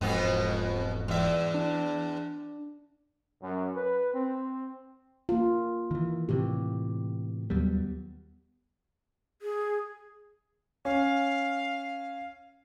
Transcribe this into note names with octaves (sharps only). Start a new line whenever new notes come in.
E1 F2 G#2 B2 B3
E2 E5
D4
F#2
B4
C4
A#3 F4
D#3 E3
A2 C3 E3 G4
D#2 F#3 G3 B3
G#4
C#4 F5